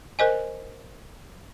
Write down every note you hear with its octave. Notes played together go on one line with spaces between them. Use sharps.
A#4 C5 D#5 G#5